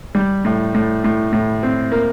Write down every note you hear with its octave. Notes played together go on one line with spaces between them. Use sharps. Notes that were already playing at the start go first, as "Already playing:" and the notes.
G3
A2
A2
A2
A2
C4
A#3